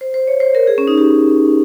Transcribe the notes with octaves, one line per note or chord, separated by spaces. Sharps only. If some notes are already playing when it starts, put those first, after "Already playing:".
C5
C5
C#5
C5
A#4
G#4
C#4
D#4
G4